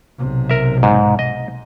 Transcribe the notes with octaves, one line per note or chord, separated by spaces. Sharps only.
B1 C3
A#4 E5
G#2
D#5